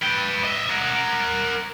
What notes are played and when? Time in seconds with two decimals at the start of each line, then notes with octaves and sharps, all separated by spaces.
0.03 B4 G5
0.44 D#5 E5
0.70 A#4 F#5